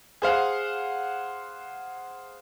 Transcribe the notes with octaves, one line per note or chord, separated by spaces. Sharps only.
G#4 C5 F5 F#5